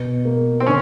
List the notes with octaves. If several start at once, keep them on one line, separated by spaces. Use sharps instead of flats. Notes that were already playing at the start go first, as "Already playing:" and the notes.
Already playing: B2
A#3
C4
D3 C#4